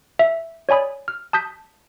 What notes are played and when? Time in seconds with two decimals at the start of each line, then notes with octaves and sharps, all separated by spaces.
0.19 E5
0.69 C#5 D5 G#5 B5 D#6
1.08 F6
1.33 A5 D#6 G6 B6